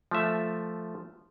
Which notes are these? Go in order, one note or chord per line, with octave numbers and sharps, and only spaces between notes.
F3 A3 E5